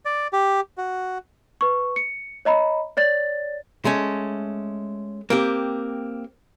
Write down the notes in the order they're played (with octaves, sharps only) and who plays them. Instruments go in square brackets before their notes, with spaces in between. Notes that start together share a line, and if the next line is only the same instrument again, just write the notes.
[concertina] D5
G4
F#4
[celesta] B4 C#6
C#7
C#5 D#5 A#5 B5
C#5 D5 A6
[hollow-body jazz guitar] G#3 A3 C#4
A#3 C4 G4